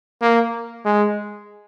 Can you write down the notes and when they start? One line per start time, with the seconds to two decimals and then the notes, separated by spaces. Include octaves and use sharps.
0.21 A#3
0.85 G#3